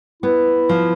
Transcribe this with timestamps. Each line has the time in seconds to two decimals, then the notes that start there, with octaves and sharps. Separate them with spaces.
0.23 B3 E4
0.69 F3